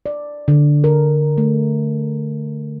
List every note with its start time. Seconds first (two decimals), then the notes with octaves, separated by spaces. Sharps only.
0.06 D5
0.48 D3
0.84 A#4
1.38 A3